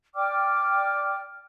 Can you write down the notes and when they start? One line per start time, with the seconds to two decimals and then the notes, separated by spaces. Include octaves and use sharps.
0.15 D5 G5 D6 F6